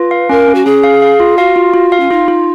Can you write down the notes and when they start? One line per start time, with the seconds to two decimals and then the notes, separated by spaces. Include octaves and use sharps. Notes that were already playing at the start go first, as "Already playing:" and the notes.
Already playing: F4 B4
0.11 F5
0.29 C#4 A#4
0.48 C#4
0.55 F#4
0.65 C#4 G#4
0.84 F5
1.02 F5
1.20 F4
1.38 F#4 F5
1.56 F4
1.74 F4
1.92 F5
2.00 C#4
2.11 D#4 F4
2.28 F4